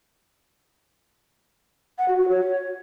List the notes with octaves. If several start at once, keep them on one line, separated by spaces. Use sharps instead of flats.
F#5
F#4
F#4
C#5